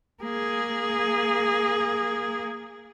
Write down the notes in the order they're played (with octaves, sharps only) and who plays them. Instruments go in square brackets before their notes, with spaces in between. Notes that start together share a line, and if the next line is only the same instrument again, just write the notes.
[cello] A#3 G#4